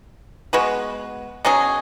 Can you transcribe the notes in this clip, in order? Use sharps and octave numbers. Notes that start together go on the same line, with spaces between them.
G#3 B3 F#4 B4
B2 F#3 C#4 G#4